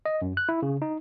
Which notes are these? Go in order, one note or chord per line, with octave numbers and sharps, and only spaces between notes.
D#5
F#2
F#6
E4
C#3
D#4